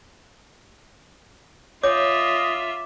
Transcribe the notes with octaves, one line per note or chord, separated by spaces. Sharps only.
F4 C#5 D#5 E5 D6